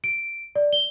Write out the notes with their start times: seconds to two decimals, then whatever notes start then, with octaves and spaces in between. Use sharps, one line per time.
0.04 D7
0.56 D5
0.73 G7